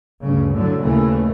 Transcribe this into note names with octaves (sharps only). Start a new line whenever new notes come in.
D2 G2 C#3
A2 D3 F#3
D#2 A#2 C#3 E3 A3